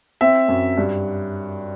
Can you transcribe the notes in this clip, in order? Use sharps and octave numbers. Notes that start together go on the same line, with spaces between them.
C4 E5
F#2
G2